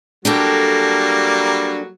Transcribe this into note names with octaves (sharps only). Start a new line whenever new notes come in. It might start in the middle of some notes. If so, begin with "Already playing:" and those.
F#3 G3 A#3 D4 G4 A4